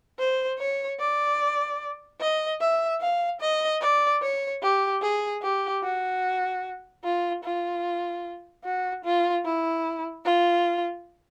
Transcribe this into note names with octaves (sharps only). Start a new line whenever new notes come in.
C5
C#5
D5
D#5
E5
F5
D#5
D5
C#5
G4
G#4
G4
F#4
F4
F4
F#4
F4
E4
F4